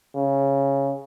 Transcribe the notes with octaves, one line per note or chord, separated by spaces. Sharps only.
C#3